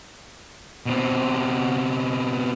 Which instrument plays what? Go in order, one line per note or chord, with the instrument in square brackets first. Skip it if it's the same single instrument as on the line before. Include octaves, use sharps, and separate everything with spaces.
[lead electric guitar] B2 C4